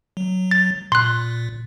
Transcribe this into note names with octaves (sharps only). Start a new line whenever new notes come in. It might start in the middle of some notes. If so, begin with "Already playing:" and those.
F#3
A6
A#2 C6 F#6